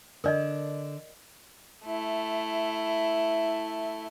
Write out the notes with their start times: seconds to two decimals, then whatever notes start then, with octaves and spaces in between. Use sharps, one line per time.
0.24 D3 D4 A#4 D5 D#5
1.86 A3 E4